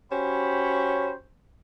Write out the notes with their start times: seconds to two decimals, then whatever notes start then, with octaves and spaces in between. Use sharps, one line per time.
0.12 C#4 F#4 G4 C5 C#5 B5